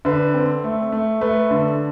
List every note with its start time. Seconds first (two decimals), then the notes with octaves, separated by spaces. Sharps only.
0.05 D3 B4
0.34 C4
0.64 A3
0.92 A3
1.21 A3 B4
1.51 D3